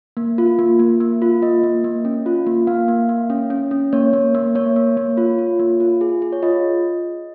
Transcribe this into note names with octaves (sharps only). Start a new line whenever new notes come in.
A#3
F4
A#3
A#3
A#3
F4
A#3 D#5
A#3
A#3
C#4
F4
A#3
A#3 F5
A#3
A#3
C#4
C#4
C#4
A#3 C#5
A#3
A#3
A#3 C#5
A#3
A#3
F4
F4
A#3
F4
G#4
G#4
C#5
F4 D#5